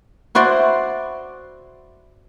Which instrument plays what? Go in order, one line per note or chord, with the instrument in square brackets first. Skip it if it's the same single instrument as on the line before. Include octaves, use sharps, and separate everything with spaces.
[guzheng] E4 F#4 C5 D5 C6